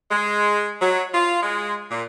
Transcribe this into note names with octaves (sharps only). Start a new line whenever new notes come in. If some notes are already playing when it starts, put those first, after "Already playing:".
G#3
F#3
F4
G#3
A#2